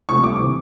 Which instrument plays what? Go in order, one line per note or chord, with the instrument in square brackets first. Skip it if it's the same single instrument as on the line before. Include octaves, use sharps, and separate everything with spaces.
[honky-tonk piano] C3 F3 A3 C#6
C2 D6
C3 E3